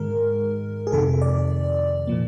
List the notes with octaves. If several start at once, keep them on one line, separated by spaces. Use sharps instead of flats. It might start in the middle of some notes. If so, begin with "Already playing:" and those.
Already playing: G#2 D#3 G#3 A#4
G#4
F2 C3 D#3 A4
D5
A#2 F3 A#3